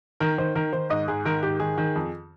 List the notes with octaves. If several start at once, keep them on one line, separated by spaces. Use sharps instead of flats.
D#3 A#4
D#3 C5
D#3 A#4
D#3 C5
G#2 D#5
G#2 G#4
D#3 A#4
G#2 G4
D#3 G#4
D#3
F2